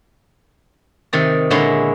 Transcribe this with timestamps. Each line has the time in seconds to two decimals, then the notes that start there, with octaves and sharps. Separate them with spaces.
1.13 C3 D#3 D5
1.50 A#2 D3 G#3 E4 C#5 C6